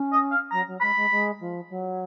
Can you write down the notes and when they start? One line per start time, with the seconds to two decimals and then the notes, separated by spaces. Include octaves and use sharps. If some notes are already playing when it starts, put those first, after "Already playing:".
Already playing: C#4
0.12 D#5
0.31 F5
0.51 F#3 A#5
0.67 F#3
0.81 G#3 B5
0.95 G#3
1.10 G#3
1.40 F3
1.69 F#3